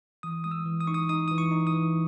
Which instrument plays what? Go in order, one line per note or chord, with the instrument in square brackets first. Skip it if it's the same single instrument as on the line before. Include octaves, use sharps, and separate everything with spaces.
[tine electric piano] E3 D#6
G#3 D#6
E6
E3
D#6
D#4 C#6
D#6
D#4 D#6
E3 D#6
C#6
D#4
D#6
E3